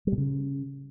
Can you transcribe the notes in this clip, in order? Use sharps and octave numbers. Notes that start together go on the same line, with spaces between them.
G3
B2
C#3